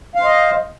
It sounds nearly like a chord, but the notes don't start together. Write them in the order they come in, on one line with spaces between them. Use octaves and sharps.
F5 C5 D#5